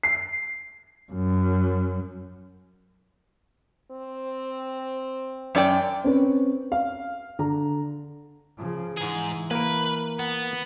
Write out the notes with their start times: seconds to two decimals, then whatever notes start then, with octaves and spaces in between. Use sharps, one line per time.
0.03 C7
1.12 F#2
3.91 C4
5.55 F#2 D5 G5
6.04 C4 C#4 B4
6.72 F5
7.39 D3 A#5
8.57 C#3 F3
8.97 G#2 E3 G#4
9.51 A#3 A#4 B4
10.19 B3